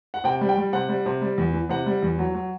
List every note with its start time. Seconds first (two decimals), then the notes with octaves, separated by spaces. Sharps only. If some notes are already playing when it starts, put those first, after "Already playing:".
0.14 F#5
0.24 C3 G5
0.41 G3
0.49 G5
0.57 G3
0.73 C3 F#5
0.89 G3
1.06 C3
1.21 G3
1.38 E2
1.53 E3
1.69 C3 F#5
1.86 G3
2.02 E2
2.19 F#3
2.34 F#3